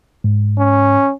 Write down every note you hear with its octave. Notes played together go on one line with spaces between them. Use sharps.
G#2
C#4